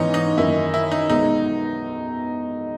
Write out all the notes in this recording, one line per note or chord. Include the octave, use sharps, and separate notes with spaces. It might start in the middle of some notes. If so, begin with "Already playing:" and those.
Already playing: G#2 E3 B3 C#4 D#4 E4
D#4
F#2 D#3 A#3 D#4 E4 A#4
E4
D#4
B1 B2 G#3 D#4